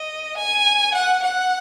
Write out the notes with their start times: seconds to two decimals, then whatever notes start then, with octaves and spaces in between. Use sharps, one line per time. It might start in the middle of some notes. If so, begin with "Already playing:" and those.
Already playing: D#5
0.38 G#5
0.94 F#5
1.23 F#5